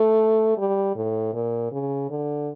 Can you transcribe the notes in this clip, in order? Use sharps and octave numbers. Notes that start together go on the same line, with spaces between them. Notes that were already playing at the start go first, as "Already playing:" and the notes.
Already playing: A3
G3
A2
A#2
C#3
D3